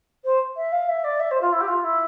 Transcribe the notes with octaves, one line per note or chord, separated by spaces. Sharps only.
C5
E5
F5
E5
D5
E5
C5
F4
E4
G4
F4
E4